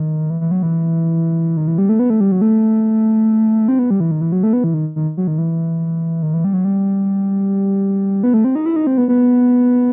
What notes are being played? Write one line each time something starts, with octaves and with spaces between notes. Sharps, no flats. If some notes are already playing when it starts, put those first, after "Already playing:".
Already playing: D#3
E3
E3
F#3
E3
D#3
E3
G3
A3
B3
A3
G3
F#3
A3
C4
B3
G3
E3
D#3
E3
F#3
A3
B3
E3
D#3
D#3
F#3
D#3
E3
D#3
E3
G3
F#3
G3
B3
A3
C4
D#4
E4
D#4
C4
B3
B3